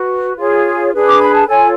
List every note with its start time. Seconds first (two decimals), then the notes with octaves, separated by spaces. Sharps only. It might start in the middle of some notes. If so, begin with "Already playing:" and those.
Already playing: F#4 B4
0.37 F4 G#4 C#5
0.92 D4 G#4 B4
1.06 D6
1.20 B5
1.34 A5
1.47 F4 A4 C#5 G#5